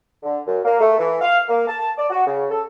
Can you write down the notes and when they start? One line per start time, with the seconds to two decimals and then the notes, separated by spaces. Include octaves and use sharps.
0.23 D3
0.46 F#2
0.65 A#3
0.80 A3
0.98 E3
1.20 F5
1.48 A#3
1.67 A5
1.97 D5
2.10 F#4
2.26 C#3
2.49 A4